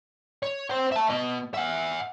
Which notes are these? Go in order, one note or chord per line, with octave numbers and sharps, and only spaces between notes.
C#5
C5 G5
E5 A5
B2 D#5
E5 F#5